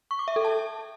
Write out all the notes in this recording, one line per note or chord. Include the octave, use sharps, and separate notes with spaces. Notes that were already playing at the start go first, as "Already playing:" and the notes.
C#6
D6
E5
A4
A5